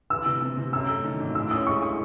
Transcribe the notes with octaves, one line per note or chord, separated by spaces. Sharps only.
E3 E6
C3
C4
C3
F#2 E6
A3
D#3
G#1
A2 E6
C#4 D#6
G#3 C#6
D#6